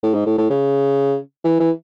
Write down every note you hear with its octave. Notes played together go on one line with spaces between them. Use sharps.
A2
G#2
A2
A2
C#3
E3
E3